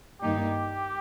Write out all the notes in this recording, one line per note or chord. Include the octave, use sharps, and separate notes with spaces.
G2 D#3 A#3 D#4 G4